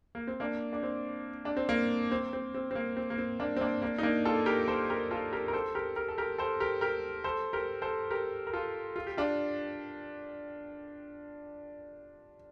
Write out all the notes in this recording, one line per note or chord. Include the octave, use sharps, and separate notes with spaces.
A#3
C4
A#3 D4
D4
C4
D4
C4
A#3
C4
C4
C4
C4
A#3
C4
A#3
C4
A#3 D4
C4
A#3 D4
A#3 D4
D#4
A#3 D4
F4 A4
G4 A#4
A4 C5
G4 A#4
F4 A4
G4 A#4
A#4
A4 C5
G4 A#4
G4 A#4
A4
G4 A#4
A4 C5
G4 A#4
G4 A#4
A4 C5
G4 A#4
A4 C5
G4 A#4
A#4
F4 A4
F4
G4
D4 F4